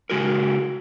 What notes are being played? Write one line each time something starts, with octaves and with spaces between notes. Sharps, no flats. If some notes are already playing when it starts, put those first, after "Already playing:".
C#3 G#3 F#4 A#4